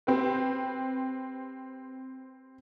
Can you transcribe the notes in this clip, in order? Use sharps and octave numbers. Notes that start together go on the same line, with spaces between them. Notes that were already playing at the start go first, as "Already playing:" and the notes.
C4 G4 B4